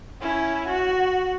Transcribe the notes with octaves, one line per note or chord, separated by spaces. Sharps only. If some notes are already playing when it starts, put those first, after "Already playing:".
C#4 E4
F#4